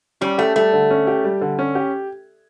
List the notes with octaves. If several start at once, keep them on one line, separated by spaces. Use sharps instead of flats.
G3 C#4
A3 G4
G3 A3
D3
C#4
G4
G3
D3
C#4
G4